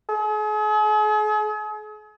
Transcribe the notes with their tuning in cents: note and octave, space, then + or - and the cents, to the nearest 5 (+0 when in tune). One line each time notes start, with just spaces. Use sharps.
G#4 +40